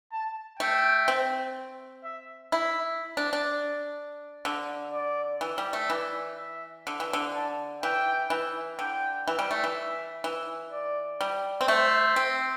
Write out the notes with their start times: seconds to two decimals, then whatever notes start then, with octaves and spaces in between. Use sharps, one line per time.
0.12 A5
0.59 A3 G5
1.08 C4
2.04 E5
2.52 E4
3.17 D4
3.33 D4
4.45 D3
4.93 D5
5.41 E3
5.58 G3
5.73 A3
5.90 E3 D5
6.38 E5
6.87 D3
7.00 E3
7.13 D3
7.34 A5
7.83 E3 G5
8.30 E3
8.79 D3 G5
9.28 E3
9.39 G3
9.51 A3
9.64 E3
9.75 E5
10.24 E3
10.72 D5
11.21 G3
11.61 C4
11.68 A3 C5
12.16 C4